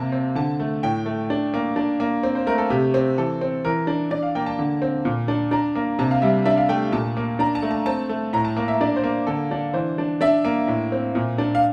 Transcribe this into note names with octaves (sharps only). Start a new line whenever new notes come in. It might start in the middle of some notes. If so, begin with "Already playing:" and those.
Already playing: C3 A#3 A5
C4
D3 A5
A3
A2 G5
A3
D4
A#3
D4
A#3
C4
C5
A3 A#4
A4
C3 G4
C4
E3 A4
C4
E3 A#4
D4
D4 D5
F5
A#3 G5
A5
D3
C4
A#2
D4
D4 A#5
A#3
C3 A5
F5
G3 E5
D4 E5
F5
A3 G5
A#2 A5
A#3
D4 A#5
A5
A3
A5
C4 A5
A3
A2 A#5
A5
A#3
E5
D4 D5
C5
A#3
D3 A4
D4
E3 C5
D4
D4 E5
A#3
A2
C4
A#2
D4
F5